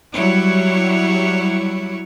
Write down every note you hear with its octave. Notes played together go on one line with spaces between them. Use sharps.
F#3 G3 E4 C#5